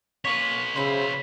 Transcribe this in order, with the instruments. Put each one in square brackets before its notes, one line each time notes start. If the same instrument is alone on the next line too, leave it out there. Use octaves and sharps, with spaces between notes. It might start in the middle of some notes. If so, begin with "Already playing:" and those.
[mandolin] A#3 C#4 [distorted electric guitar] B4 C#5 [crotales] B6
[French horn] C#3 [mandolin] C5 E5 B5